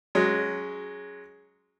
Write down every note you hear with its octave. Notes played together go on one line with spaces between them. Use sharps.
F#3 G#3 C#4